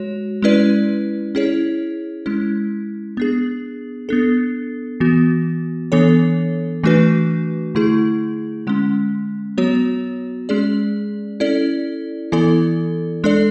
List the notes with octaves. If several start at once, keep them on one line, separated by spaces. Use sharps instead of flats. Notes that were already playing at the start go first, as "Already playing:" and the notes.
Already playing: G#3 F#4 C#5
G#3 C#4 E4 B4 D5
C#4 E4 G#4 C#5
G#3 C#4 E4
B3 D4 G#4
B3 D4 A4
E3 B3 F#4
E3 B3 D4 A4 C#5
E3 A3 D4 F#4 B4
D3 A3 E4 G#4
D3 G#3 C#4
F#3 B3 F#4 C#5
G#3 C#4 G#4 D5
C#4 E4 A4 D5
E3 B3 E4 A4 D5
G#3 D4 A4 D5